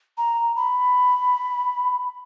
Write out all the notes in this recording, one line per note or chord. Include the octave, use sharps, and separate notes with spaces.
A#5
B5